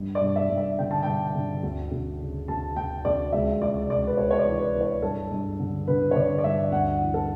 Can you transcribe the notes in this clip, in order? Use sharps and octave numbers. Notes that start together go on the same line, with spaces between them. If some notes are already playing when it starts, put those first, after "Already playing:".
Already playing: G2
D5
G2
E5
G2
E5
D3 G5
A5
G2 G5
D3
D2
D2
C#3
D2 A5
D2 G5
D2 D5
C#2 E5
C#2 D5
C#2 D5
B4
C#2 C#5
C#5
D5
E3
B4
E3
C#5
G2 A4
G2
D3
D3 B4
C#5
D3 D5
D5
G2 E5
D2 F#5
E3
A4